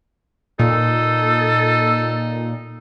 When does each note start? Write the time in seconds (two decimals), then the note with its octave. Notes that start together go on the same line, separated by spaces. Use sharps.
0.59 A#2 D#4 A4